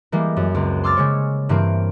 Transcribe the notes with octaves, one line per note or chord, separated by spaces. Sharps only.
E3 G3 G#3 A#3
F#2
C#2 C4
C6 D6 E6 F6 A6
C#3 G#3 C#5
G2 E3 A#3 C4 D7